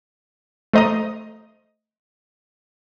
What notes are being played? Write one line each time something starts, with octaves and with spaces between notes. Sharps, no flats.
A3 C5 D#5 A#5 D#6